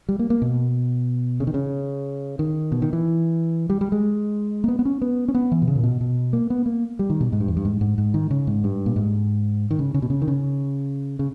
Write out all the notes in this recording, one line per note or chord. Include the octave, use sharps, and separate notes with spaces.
G3
A#3
A#3
B2
C#3
D#3
C#3
D#3
B2
D#3
E3
G3
G3
G#3
A#3
B3
B3
C#4
B3
C#4
B3
E3
B2
C#3
A#2
B2
B2
A#3
B3
A#3
G3
D#3
B2
G#2
G2
E2
G2
G#2
G#2
G#2
D#3
C#3
G#2
G2
A#2
G#2
D#3
C#3
C#3
B2
C#3
D#3
C#3
C#3